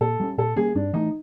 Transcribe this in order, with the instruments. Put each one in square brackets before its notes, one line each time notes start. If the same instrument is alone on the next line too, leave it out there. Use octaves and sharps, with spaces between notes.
[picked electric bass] A#2 [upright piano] A4
[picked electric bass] G3 A#3 C#4
[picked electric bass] A#2 [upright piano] A4
[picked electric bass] G3 A#3 C#4 [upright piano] G#4
[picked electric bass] G2 [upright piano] D4
[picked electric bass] E3 A3 [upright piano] D#4